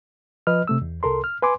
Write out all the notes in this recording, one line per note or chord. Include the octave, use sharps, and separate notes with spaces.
F3 B4 D#5 F6
C3 A3 E6
E2
C2 A4 A#4 C6
F6
B4 G#5 C6 D6